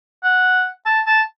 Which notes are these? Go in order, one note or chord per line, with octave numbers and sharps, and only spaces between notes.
F#5
A5
A5